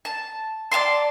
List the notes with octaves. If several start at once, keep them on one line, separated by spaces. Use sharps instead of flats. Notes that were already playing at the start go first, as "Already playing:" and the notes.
A5
D5 F5 A5 C6